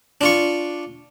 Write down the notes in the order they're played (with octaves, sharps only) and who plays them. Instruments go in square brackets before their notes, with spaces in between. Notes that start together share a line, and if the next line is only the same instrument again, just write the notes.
[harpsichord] D4 F4 C#6